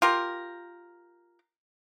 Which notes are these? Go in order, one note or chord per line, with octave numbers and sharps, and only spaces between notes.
F4 G4 A#4